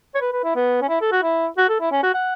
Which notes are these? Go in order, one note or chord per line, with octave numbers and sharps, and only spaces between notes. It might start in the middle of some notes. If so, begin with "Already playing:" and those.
C#5
B4
B4
E4
B3
C#4
E4
A4
F#4
E4
F#4
A4
E4
C#4
F#4
F#5